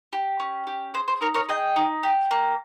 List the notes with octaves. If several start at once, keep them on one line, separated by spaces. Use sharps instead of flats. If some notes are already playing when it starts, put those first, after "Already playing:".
G4
C#4
G4
G#4 C5
C5
D#4 A#4 C#5
A#4 C#5
G#4 D#5 G5
D#4
G4
A#3